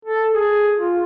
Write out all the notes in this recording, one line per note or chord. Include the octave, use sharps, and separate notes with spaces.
A4
G#4
F4